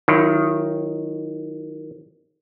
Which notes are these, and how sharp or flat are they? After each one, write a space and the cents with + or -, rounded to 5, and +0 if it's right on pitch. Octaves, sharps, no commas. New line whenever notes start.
D#3 +0 F#3 +0 E4 +35